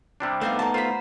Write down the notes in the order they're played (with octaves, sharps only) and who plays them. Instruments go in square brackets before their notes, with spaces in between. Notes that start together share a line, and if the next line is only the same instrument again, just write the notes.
[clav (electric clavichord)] C3 G3 D4
[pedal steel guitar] A3 B3 D#4 [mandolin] F4 F#4 C5
[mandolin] A#3 A5 [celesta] F#5 A#5
[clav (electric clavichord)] F4 [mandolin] C5 B5